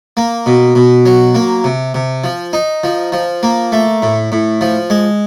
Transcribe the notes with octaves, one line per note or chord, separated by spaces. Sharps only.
A#3
B2
B2
F#3
A#3
C3
C3
F3
D#4
F3
F3
A#3
A3
A2
A2
F3
G#3